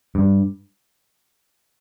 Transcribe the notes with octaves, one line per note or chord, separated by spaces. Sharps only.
G2